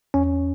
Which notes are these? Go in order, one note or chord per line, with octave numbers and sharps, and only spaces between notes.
E2 C#4